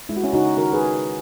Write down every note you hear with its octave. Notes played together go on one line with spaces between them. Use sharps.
G#3 E4
F#4
C#4 E4
C#3 D#4 F#4
D#3 F#4 A#4
G#4 B4